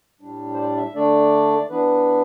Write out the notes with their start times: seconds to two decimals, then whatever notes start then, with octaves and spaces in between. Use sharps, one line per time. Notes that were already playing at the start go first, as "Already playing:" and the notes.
0.21 A2 G3 D4
0.54 C5
0.58 D5
0.77 E5
0.95 D3 A3 D4 D5
1.70 E3 B3 D4 B4